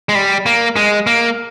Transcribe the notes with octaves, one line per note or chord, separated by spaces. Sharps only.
G#3
G3
A#3
G#3
A#3